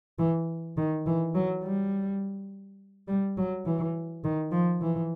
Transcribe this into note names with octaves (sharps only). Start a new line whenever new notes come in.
E3
D#3
E3
F#3
G3
G3
F#3
E3
D#3
F3
E3